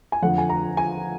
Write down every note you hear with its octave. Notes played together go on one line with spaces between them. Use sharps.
G#5
F2 D3 F3 F#5
G#5
A#5
G#5